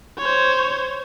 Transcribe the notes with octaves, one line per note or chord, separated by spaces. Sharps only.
C5 C#5